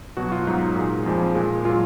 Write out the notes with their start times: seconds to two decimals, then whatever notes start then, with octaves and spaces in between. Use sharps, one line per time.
0.17 B2 F#3 F#4
0.32 F4
0.47 G#2 F#3 D#4
0.76 A#2 G#3
1.06 F2 F3 G#3
1.35 A#2 G#3
1.65 A#2 F#3 F4